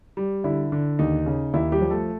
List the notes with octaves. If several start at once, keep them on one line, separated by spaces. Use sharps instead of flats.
G3
D3 E4
D3
D#2 D#4
C#3
D#2 E4
G3 G4
F3
A3 A4